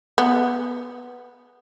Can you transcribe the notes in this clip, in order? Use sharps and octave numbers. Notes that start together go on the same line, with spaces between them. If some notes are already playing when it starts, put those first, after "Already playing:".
B3